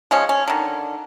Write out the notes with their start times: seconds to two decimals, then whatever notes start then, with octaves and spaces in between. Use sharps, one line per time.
0.11 F3 G#3 C#4
0.29 C#4
0.48 D3 D#3